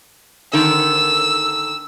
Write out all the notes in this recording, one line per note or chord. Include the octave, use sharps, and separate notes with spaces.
D3 D#3 E6